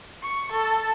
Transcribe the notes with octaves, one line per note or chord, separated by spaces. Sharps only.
C#6
A4